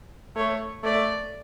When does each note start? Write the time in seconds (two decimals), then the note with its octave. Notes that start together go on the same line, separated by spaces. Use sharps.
0.36 A3 C#5
0.84 A3 D5